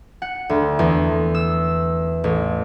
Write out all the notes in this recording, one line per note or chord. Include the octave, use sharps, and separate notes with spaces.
F#5
D2
E2
E6
A1